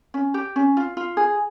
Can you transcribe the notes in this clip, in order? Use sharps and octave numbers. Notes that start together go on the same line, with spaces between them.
C#4
G4
C#4
F4
F4
G#4